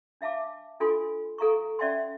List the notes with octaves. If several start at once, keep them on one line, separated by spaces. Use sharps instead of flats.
D4 E5 F5 A5 D6
D4 F4 A4 G#5 C6
A4 F5 A#5 C#6
C#4 D5 E5 F#5 G#5 C6